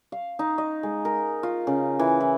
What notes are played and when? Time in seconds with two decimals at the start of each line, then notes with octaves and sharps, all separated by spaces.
0.12 F5
0.39 D#4
0.58 D#5
0.83 G#3
1.05 A#4
1.43 F4
1.67 C#3
1.99 E3
2.21 E4